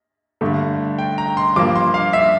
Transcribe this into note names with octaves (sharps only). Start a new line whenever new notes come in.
G2 D3 A3
G5
A#5
C6
G2 F3 A#3 D6
C6
F5
E5